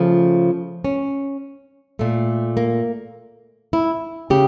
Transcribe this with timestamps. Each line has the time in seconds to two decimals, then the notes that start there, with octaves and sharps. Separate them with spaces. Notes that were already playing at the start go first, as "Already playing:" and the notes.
Already playing: C#3 F3 A3
0.84 C#4
1.99 A#2 A3
2.57 A#3
3.73 E4
4.30 C#3 G4